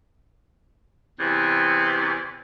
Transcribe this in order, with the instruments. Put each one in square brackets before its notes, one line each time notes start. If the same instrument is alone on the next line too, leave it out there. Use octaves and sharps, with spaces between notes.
[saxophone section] E2 C3 E3